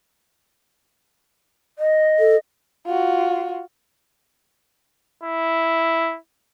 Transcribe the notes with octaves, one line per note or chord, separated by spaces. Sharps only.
D#5
A4
F4 F#4
E4